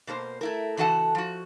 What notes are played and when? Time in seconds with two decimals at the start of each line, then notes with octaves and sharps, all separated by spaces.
0.07 B2 A#3 A4 C5
0.41 A3 E4 A#4
0.77 C#3 E3 F#4 A4 F#5 A5
1.15 F3 F#4